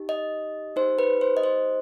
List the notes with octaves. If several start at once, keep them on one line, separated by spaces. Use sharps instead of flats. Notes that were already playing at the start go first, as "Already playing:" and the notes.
Already playing: D#4 G4
D#5
D#4 G4 C5
B4
C5
D#5
C5